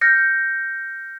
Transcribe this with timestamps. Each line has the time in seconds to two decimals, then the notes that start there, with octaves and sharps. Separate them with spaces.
0.01 F6 G6 A#6 C#7